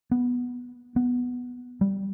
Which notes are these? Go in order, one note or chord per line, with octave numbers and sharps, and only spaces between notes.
B3
B3
G3